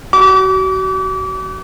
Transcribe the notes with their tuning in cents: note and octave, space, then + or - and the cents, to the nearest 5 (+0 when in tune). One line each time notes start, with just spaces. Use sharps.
F#4 +35 D6 -35